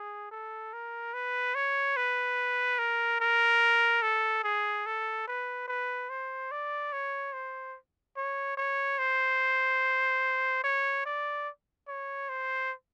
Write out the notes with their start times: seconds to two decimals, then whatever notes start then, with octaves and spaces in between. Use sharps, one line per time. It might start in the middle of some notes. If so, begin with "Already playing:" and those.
Already playing: G#4
0.32 A4
0.73 A#4
1.14 B4
1.55 C#5
1.97 B4
2.79 A#4
3.20 A#4
4.02 A4
4.44 G#4
4.86 A4
5.28 B4
5.68 B4
6.10 C5
6.51 D5
6.93 C#5
7.33 C5
8.17 C#5
8.57 C#5
8.99 C5
10.64 C#5
11.06 D5
11.88 C#5
12.29 C5